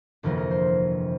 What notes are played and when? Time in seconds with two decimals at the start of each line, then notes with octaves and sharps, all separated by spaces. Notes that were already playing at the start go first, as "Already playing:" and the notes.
0.23 G1 F2 C3 E3 A#3 A#4
0.38 A#4
0.51 C5